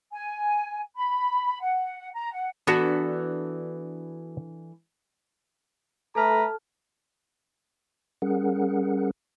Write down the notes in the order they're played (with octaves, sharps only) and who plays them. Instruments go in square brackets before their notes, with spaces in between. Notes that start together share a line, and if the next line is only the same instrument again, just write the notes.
[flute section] G#5
B5
F#5
A#5
F#5
[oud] E3 D4 A4 [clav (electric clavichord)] B3 F#4
[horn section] A3 B4 A#5 [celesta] A4 A5 F6
[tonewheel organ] G3 C#4 G#4 A#4 F#5